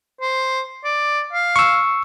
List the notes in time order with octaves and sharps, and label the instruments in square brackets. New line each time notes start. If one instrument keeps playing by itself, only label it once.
[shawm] C5
D5
F5
[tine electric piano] C#6 E6